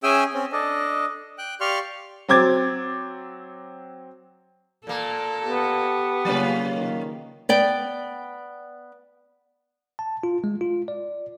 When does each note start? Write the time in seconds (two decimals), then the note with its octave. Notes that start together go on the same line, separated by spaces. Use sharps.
0.03 C#4 G#4 E5 G5 G#5 E6
0.33 C4 C#4
0.52 D4 A4 D#5
1.38 G5 F#6
1.61 G4 D5 F5 C6 C#6 F6
2.29 F#3 C4 D6 G#6 A6
4.87 A#2 A#3 A4
5.44 B3 G4
6.25 C#3 F#3 A#3 C#4 F4 B4
6.74 D#3
7.49 B3 D5 G5
9.99 A5
10.23 F4
10.44 G#3
10.61 F4
10.88 D5